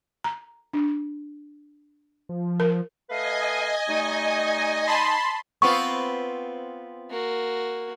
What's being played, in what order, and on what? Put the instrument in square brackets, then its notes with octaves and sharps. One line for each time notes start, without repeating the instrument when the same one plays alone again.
[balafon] A#5
D4
[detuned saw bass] F3
[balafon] A#4
[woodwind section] A3 B4 F5 [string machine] D#5 G#5
[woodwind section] G3 A3 D#4
[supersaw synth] A5 B5 C6
[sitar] B3 C4 F4 [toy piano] C#6
[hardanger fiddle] A#3 F#4